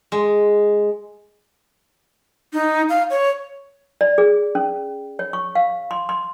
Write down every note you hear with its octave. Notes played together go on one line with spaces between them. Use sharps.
G#3
D#4
F5
C#5
D5
G#4
C#4
C#5
C#6
F5
C6
C6